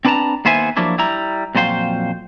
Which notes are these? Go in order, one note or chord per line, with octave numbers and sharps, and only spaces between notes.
C4 D4 B4 G5 A5 A#5
D#2 A#3 B3 C5 E5 G#5
F3 F#3 A#3 D4 E4
G3 E4 A#5
F2 A#2 F#3 C5 F5 G5